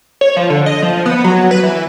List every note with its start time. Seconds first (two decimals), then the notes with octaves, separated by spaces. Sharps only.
0.21 C#5
0.37 F3
0.50 D3
0.66 D#5
0.83 F3
1.06 B3
1.24 F#3
1.51 B4
1.63 E3